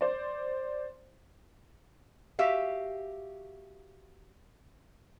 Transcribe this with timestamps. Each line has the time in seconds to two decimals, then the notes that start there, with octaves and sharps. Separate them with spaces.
0.01 C5 D5
2.39 F#4 G4 E5 F5